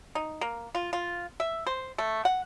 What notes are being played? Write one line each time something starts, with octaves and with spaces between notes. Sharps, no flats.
D#4
A#3
F4
F4
E5
C5
A3
F#5